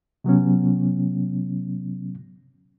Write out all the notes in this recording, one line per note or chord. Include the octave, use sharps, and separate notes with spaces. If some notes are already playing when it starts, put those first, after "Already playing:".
C3 F#3 B3 C#4